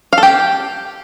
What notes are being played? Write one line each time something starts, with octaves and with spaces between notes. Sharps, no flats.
F5
A4
G4